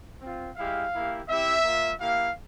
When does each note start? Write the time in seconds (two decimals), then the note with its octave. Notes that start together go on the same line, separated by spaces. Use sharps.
0.20 C4 F4
0.56 G#3 E4 G4 F5
0.93 A#3 E4 G4
1.27 C4 E4 G4 E5
1.64 A#3 F4
1.99 A#3 E4 G4 F5